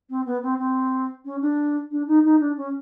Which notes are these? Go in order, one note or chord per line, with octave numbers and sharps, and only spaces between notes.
C4
B3
C4
C4
C#4
D4
D4
D#4
D#4
D4
C#4